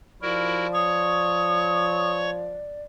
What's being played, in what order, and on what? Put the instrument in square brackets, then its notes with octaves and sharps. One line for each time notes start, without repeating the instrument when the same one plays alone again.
[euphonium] F3 [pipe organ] E4 F#4 A#4 [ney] D5
[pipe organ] C#5 C#6 [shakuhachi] D#6